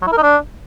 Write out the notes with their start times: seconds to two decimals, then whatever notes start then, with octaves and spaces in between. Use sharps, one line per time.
0.02 F#3
0.07 E4
0.12 A#4
0.18 D#4
0.23 D4